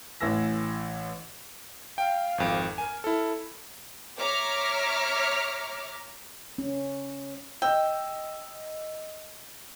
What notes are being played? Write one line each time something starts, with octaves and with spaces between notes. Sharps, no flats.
A1 E3 E6 A#6
F5 G5
G#1 F2
A#4 G#5
E4 A4
C#5 E5 A#5 D6 F6
C#4
D#5 G5 E6